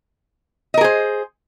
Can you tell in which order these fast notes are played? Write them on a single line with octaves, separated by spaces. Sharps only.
D#5 A#4 G#4 C5